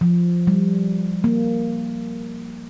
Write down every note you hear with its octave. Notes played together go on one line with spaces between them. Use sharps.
F3
G3
A#3